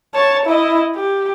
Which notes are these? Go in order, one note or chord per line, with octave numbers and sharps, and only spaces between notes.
C#5 A5
E4 D#5
G4